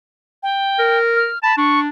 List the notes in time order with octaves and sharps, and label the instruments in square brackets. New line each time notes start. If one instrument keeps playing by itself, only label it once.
[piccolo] G5
[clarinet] A#4
[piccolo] F6
[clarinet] A5 [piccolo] B5
[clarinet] D4 [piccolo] C#6